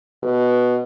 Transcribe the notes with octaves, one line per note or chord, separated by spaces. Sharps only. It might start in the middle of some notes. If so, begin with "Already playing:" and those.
B2